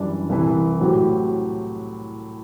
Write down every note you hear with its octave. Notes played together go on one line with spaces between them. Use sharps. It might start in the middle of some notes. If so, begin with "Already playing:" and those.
Already playing: F#2 E3 G3 D4
C2 C3 E3
A2 F#3 C4 G4